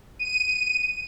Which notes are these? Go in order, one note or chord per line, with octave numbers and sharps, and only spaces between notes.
D#7